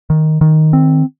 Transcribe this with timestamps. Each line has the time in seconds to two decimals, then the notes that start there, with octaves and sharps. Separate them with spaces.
0.10 D#3
0.41 D#3
0.73 C4